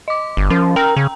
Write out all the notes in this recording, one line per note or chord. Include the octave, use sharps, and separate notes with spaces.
D#5 D6
G1
F3 C#4
A#4 G5 A#5
C#3